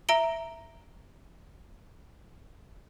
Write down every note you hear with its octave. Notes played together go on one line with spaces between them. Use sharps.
E5 A#5 D7 G7